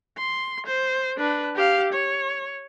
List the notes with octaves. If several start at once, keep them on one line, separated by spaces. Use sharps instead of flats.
C6
C5
D4 B4
G4 F5
C#5